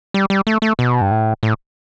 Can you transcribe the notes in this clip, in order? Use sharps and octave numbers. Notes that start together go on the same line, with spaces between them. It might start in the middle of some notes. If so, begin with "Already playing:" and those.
G3
G3
A3
A3
B2
G2
A2
A2